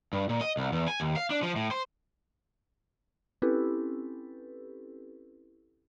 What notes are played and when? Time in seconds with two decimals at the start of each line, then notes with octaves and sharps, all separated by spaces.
0.13 G2
0.29 A#2
0.41 D#5
0.57 C2
0.72 E2
0.88 G#5
1.00 D#2
1.16 F5
1.30 D4
1.43 F3
1.56 A2
1.71 C5
3.42 C4 C#4 E4 G4 A4 B4